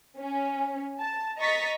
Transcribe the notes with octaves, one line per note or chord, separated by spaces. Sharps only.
C#4
A5
D#5 A#5 C#6 A6 B6